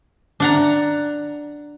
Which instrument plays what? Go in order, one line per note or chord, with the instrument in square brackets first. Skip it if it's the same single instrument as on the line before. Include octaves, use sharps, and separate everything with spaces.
[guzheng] D4 F#5 A#5